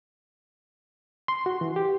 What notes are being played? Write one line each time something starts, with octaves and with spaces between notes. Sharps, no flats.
C6
F#4
E3
G4